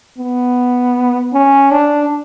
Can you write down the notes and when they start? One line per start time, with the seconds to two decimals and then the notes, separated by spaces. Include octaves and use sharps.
0.18 B3
1.33 C#4
1.71 D4